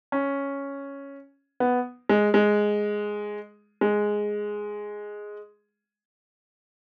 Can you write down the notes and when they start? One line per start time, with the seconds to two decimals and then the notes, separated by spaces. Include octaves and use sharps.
0.12 C#4
1.60 B3
2.09 G#3
2.34 G#3
3.81 G#3